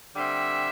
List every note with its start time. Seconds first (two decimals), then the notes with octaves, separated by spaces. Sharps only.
0.14 D3 G3 C4 E5